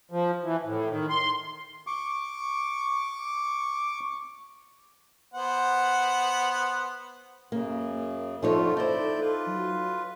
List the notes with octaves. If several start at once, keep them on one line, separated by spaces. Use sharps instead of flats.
F3
E3
A2
D#3
C6
C#6 D6
B3 C5 F#5
F#2 C#3 A#3
D3 F3 A3 D#4 F4 A4 C#5
D#4 E4 C5 D5 G6
F4 B4
F#3